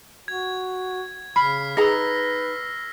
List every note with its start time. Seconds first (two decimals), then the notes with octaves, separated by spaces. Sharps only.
0.28 F#4 G#6
1.36 C#3 B5 F6 B6 C7
1.77 D#4 G#4 B4 A#5 E6 A#6